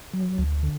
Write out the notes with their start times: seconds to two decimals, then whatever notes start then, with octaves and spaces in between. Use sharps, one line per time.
0.13 F#3
0.38 D2
0.63 D3